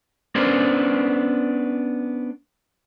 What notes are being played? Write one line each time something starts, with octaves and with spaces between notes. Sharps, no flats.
A#3 B3 C#4 D4 A#4 C5